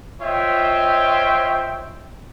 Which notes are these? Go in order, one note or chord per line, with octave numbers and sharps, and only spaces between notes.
F4 C5 C#5 D#5 E5 G5